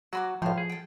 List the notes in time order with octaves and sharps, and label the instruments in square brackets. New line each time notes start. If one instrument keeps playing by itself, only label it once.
[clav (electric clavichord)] F#3 [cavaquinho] F#4 B5 D6
[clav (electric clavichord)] B1 A2 [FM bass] F3 [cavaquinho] C5 F5
[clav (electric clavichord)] G#4
[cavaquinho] A4 G5